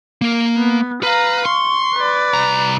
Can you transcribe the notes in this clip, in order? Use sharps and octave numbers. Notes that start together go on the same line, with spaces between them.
A#3 A#4
B3
B4 F5 A#5
C6 C#6
B4 D5
C2 A#5